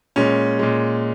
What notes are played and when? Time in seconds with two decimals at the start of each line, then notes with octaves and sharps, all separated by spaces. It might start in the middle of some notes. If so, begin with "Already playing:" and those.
0.16 A#2 G#3 C#4
0.59 A#2 G#3